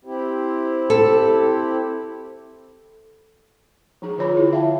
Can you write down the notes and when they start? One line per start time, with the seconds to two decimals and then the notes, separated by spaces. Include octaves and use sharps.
0.05 C4 E4 G4
0.90 A4
4.02 F3 D#4 G#4
4.18 D3 F4 C#5 B5
4.34 E4 G#4
4.53 E5 F5 G5 A5